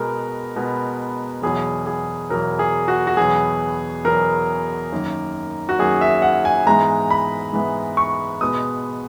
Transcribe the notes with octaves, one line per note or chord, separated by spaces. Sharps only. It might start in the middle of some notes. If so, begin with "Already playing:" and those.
Already playing: B2 G#3 B3 A#4
B2 G#3 B3
E2 B2 F#3 G#4
G#4
E2 B2 F#3 A#4
G#4
F#4
F#4
E2 B2 F#3 B3 G#4
E2 B2 F#3 B3 A#4
F#2 D#3 A#3
F#4
F#2 D#3 A#3 G#4
E5
F#5
G#5
G#2 E3 G#3 B3 A#5
B5
G#2 E3 G#3 B3
C#6
B2 G#3 B3 D#6